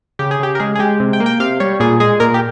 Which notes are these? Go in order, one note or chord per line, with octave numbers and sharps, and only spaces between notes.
C#3 G4
G#4
C#3 G4
A#4
G#3 G#4
G#4
G#3 G4
C3
G5
A#3
G5
C3 F5
G3 C#5
A#2 G#4
G#3 G#4
A#2 A#4
G4